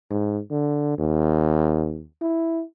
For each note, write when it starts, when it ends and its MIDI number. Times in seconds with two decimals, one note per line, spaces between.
0.11 0.39 44
0.51 0.95 50
0.98 2.03 39
2.21 2.63 64